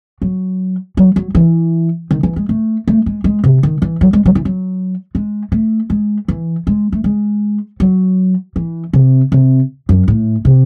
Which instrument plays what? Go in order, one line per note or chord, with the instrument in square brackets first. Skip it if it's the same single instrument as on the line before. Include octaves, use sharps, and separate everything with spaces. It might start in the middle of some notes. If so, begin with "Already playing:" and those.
[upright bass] F#3
F#3
F#3
E3
D#3
E3
G#3
A3
A3
G#3
G#3
C3
D#3
E3
F#3
G#3
F#3
E3
F#3
G#3
A3
G#3
E3
G#3
A3
G#3
F#3
E3
C3
C3
F#2
A2
C3